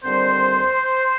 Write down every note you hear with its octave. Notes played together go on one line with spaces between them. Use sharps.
D#2 D3 G3 C4 C5